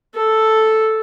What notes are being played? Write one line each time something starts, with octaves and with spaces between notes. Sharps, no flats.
A4